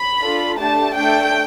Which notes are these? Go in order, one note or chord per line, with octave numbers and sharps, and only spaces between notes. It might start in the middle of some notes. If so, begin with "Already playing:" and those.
Already playing: B5
D4 F4 A4
A3 D4 G4 A5
A3 D4 A4 G5